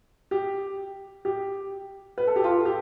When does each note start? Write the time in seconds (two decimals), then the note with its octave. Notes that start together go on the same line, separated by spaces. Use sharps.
0.31 G4
1.25 G4
2.18 B4
2.27 A4
2.36 G4
2.44 F4 A4
2.65 G4